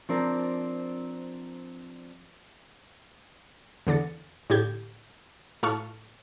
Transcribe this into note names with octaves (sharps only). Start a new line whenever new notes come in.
F3 C4 D4 A#4
E2 D3 D5 A6 C#7
A2 D3 G4 G6 G#6
A2 F4 A4 A5 C#6 F6